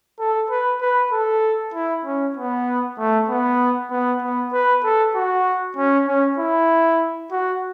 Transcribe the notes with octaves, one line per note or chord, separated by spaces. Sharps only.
A4
B4
B4
A4
E4
C#4
B3
A3
B3
B3
B3
B4
A4
F#4
C#4
C#4
E4
F#4